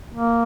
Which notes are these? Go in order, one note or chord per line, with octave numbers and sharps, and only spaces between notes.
A#3